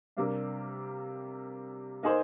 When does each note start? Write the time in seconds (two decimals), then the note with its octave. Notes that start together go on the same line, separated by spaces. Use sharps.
0.17 C3 G3 A#3 D4
2.03 A#3 D#4 G#4 C5